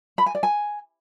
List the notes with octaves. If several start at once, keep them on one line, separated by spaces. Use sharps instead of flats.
B5
G#5
D5
G#5